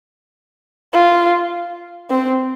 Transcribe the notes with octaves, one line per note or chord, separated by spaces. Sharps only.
F4
C4